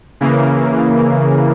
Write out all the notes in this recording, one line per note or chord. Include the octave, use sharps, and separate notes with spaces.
C#3 E3 A#3